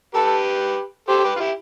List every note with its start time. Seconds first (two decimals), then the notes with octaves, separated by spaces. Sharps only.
0.14 G4 A4 B4
1.08 G4 A4 C5
1.24 G4 B4
1.36 F4
1.40 E4 G4